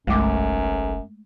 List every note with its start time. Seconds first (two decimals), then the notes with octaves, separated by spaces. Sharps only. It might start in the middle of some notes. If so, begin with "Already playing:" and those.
0.07 F#1 B1 F#2 G#3 A3 D6